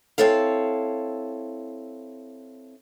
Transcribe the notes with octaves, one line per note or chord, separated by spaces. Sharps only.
C4 E4 A4 C#5 F5